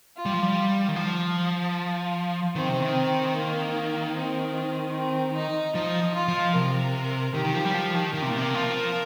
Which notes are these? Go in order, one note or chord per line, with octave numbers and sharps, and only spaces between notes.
F4
G3
F3
G3
D#3
F3
D#3 C4
C3
D#3
A#3
C4
C4
D#4
F3 D#4
F4
F3
C3 A#4
D#3 G4
D#3
F3
G3
F3
D#3
D#3 A#4
C3
A#2
C3
F3